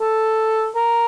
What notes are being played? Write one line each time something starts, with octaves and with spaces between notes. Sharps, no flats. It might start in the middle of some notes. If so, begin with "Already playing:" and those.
A4
A#4